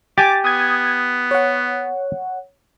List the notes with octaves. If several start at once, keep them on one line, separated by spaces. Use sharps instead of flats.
G4 G#5 D6 A6
B3 D#6 G#6
C#5 F#5